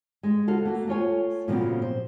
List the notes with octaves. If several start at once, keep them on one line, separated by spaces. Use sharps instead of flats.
G#3
C#3 F#4 A4 F5
A3 A#3 F#4
A3 F4 C#5 G#5
A#2 C#3 F3 F#3 B3 C4
C5